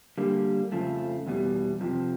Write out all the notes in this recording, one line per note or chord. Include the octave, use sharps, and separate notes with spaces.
D3 G3 A#3
F2 C#3 F3 A3
E2 B2 G3
F2 C3 F3